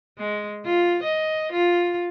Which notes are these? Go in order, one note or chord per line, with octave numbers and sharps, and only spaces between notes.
G#3
F4
D#5
F4